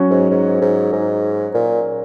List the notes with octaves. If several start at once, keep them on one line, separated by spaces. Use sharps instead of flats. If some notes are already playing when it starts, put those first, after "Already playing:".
Already playing: F#3 C#4 F#4
G#2
G#2
G#2
G#2
A#2